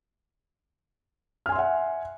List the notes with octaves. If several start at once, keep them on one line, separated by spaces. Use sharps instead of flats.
E5 F#5 G#5 C6 F6